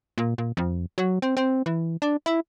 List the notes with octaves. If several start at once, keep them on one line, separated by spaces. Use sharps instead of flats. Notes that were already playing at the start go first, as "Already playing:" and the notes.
A#2
A#2
F2
F#3
C4
C4
E3
D4
E4